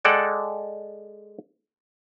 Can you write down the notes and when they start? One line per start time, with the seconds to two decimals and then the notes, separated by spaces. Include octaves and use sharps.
0.05 G#3 A4 D5 F#5 G5